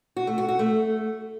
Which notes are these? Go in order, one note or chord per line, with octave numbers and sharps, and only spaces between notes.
F#4
A3
F#4
F#4
A3